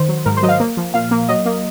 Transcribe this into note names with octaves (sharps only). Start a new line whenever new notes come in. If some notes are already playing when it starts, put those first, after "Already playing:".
Already playing: D#3 C5
F#3
G#2 A#4
C5
F#3 D#5
F5
A#3
F3
A#2 F5
A#3
F#3 D#5
A#3